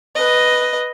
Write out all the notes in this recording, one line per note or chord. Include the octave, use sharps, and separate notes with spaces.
B4 D#5